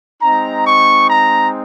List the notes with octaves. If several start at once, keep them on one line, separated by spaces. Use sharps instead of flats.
G#3 C4 D#4 A#5
C#6
A#5